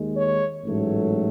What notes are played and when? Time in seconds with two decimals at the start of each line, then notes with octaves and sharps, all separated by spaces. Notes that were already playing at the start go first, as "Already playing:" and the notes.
Already playing: D#2 D#3 G#3
0.16 C#5
0.64 A1 G#2 F#3 A3